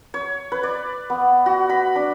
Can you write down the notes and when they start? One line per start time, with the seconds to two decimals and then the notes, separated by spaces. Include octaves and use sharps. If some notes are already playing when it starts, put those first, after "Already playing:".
0.14 C#5
0.52 B4
0.63 D5
1.10 B3
1.46 F#4
1.69 B5
1.96 D4